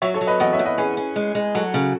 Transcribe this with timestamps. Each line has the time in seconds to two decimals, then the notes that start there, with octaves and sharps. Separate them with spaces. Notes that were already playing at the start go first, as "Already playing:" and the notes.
0.02 F#3 C#5 E5
0.14 A4 C#5
0.21 F#3
0.27 B4 D#5
0.40 E2 D#5 F#5
0.53 C#5 E5
0.59 E2
0.65 B4 D#5
0.78 C#4 G#4 B4
0.97 C#4
1.16 G#3
1.35 G#3
1.54 F#3 F#4 A4
1.74 C#3